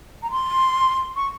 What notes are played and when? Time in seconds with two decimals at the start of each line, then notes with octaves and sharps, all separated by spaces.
0.23 A#5
0.31 C6
1.16 C#6